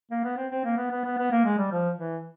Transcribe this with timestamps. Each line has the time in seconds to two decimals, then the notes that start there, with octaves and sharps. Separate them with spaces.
0.11 A#3
0.24 B3
0.37 C4
0.51 C4
0.65 A#3
0.77 B3
0.91 B3
1.04 B3
1.18 B3
1.32 A#3
1.45 G#3
1.59 G3
1.72 F3
1.98 E3